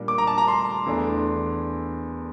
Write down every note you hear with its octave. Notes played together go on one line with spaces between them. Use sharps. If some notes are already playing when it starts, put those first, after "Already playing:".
Already playing: A#2 G3 D4
D6
A#5
A5
A#5
C6
E2 E3 A3 D4